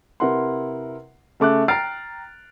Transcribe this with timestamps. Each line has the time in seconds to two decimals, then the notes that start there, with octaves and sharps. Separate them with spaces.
0.20 C3 E4 A#4 B4 F#5 C6
1.40 C#3 A3 D6 F#6
1.68 G5 A#5 F6 A6 C7 D7